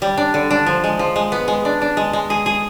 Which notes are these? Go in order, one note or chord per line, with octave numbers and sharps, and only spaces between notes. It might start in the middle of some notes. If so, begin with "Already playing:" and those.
G3
D4
D3
D4
F3
G#3
F3
G#3
B3
G#3
D4
D4
G#3
G#3
G#4
G#4